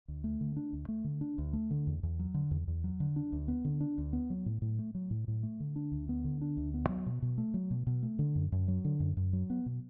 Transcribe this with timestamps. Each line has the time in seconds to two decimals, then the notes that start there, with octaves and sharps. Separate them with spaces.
0.08 D2
0.24 A3
0.41 D3
0.57 D4
0.73 D2
0.88 A3
1.04 D3
1.21 D4
1.38 D2
1.53 A3
1.71 D3
1.87 E2
2.03 E2
2.19 F#3
2.34 D3
2.51 E2
2.68 E2
2.84 F#3
3.00 D3
3.16 D4
3.32 D2
3.48 B3
3.65 D3
3.80 D4
3.98 D2
4.13 B3
4.30 F#3
4.46 A2
4.62 A2
4.79 A3
4.95 F#3
5.11 A2
5.28 A2
5.43 A3
5.60 D3
5.76 D4
5.92 D2
6.09 B3
6.25 D3
6.41 D4
6.57 D2
6.74 B3
6.89 F#3
7.06 B2
7.22 B2
7.38 A3
7.54 F#3
7.71 B2
7.87 B2
8.03 A3
8.19 D3
8.36 F#2
8.52 F#2
8.68 F#3
8.85 D3
9.00 F#2
9.17 F#2
9.33 F#3
9.50 B3
9.66 B2